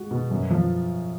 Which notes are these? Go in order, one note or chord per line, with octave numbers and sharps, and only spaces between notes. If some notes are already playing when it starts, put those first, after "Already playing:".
Already playing: G#3 F#4
B2
F#2
F3